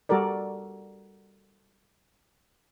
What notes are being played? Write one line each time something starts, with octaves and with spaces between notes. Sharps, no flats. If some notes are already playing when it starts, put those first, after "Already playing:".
G3 F#4 A4 A#4 D5